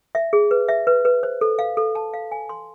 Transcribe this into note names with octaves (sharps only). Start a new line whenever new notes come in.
E5
G#4
B4
E5
B4
B4
C5
A4
F5
A4
A5
F5
G#5
C6